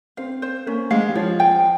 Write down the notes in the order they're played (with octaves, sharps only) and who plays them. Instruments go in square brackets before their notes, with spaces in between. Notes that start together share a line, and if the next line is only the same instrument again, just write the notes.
[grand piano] C4 [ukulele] F5
[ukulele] C5
[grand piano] A#3 [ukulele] C#4
[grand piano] G#3 [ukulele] F5
[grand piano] G3
[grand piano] F3 [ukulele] C#5
[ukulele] G5